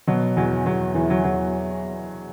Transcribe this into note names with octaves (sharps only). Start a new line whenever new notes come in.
B2 F#3
E2 F#3
E2 F#3
E2 E3
F#3
E2 F#3